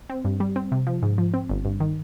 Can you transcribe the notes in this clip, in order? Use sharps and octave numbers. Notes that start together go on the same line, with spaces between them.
C4
G2
G3
C4
C3
F3
G#2
F3
C4
G1
G2
D#3